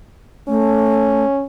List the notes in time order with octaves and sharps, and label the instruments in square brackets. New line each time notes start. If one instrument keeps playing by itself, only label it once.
[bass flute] A3 [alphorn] C#4